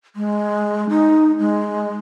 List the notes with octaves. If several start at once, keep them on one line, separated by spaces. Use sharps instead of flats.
G#3
D#4
G#3